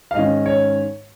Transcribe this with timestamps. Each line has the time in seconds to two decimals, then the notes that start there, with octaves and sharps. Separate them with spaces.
0.11 F5
0.15 G#2 D#3 C#4 D#5
0.46 C#5